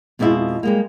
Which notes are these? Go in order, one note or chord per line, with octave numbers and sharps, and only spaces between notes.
F2 B2 G#3 B3 E4 F4
G3 G#3 A#3